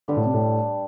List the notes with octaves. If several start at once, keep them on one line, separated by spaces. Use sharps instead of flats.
G2 D3 G3 D4 G4
A2
C3
A2